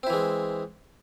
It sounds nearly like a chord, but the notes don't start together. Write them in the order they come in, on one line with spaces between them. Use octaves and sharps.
C4 E4 E3 G#3